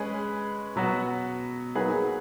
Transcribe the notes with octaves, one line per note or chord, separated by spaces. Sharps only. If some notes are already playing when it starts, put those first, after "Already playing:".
Already playing: G#3 C#4 G#4 B4
B2 F#3 B3 F#4
F#3 A#3 D#4 G#4 B4